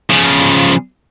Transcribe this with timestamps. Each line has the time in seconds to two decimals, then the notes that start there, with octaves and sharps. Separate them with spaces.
0.10 C#3 F3